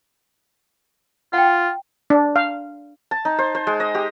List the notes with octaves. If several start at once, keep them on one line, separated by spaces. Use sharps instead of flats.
F4 F#5 G5
D4
F5
A5
D#4
C5
C5
G#3
D#5
G4